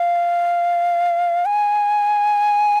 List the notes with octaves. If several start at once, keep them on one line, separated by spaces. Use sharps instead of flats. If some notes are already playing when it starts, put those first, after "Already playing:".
Already playing: F5
G#5